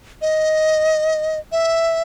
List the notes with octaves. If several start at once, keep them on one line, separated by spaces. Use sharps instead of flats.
D#5
E5